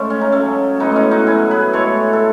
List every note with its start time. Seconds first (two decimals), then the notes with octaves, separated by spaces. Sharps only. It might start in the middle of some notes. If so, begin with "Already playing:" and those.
Already playing: C#3 G#3 A3
0.10 C#4
0.21 D#4
0.32 C#3 F#3 A3 C#4
0.80 A2 G#3 B3 D#4
0.92 C#4 D#4 E4
1.11 D#4 F#4
1.27 B2 F#3 E4 G#4
1.51 G#4 B4
1.73 A2 G#3 A4 C#5
2.13 A4